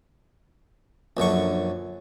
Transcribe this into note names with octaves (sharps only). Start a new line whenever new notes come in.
A#1 F#2 D3 C#6